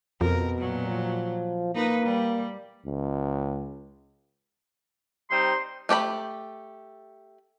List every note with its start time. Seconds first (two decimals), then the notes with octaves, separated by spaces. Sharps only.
0.21 F2 B2 A#4
0.58 A#2 F#3
0.88 F3
1.75 A#3 D#4 B4
2.05 G3
2.85 C#2
5.30 G3 C4 D#4 C6
5.89 A3 G4 D5 B5